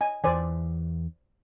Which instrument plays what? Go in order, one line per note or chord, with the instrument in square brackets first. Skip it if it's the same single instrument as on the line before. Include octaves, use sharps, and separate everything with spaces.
[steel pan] D#5 G#5
[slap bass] E2 E3 [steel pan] C5 D5 G#5